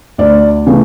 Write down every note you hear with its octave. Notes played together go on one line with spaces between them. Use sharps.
D2 D5
C#3 E3 A3